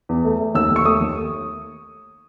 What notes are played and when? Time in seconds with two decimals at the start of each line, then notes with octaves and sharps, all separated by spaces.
0.09 E2
0.25 A3
0.40 A3
0.54 D#2 E6
0.70 D#2
0.76 C#6
0.85 A3 D#6
1.00 D#2